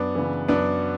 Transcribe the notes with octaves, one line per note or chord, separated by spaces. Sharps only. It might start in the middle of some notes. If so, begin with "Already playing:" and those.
Already playing: F#2 B3 D4
C#3 E3
F#2 B3 D4